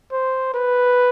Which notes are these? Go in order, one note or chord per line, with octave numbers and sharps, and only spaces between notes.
C5
B4